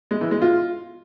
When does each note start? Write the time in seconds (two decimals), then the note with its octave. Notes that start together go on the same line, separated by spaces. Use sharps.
0.11 G#3
0.21 E3
0.31 G#3
0.42 F4